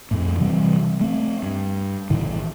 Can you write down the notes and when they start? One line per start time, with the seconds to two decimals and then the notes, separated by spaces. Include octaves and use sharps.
0.11 F2 A2
0.39 C3 E3 G3 C4
1.01 A3 C4
1.42 G2
2.10 A1 A2 D#3